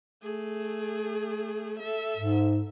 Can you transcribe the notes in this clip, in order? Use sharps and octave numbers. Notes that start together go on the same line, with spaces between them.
A3 G#4
A4 E5
G#2